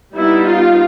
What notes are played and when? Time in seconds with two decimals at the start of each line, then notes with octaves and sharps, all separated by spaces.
0.13 G3 B3 D#4 E4
0.44 F4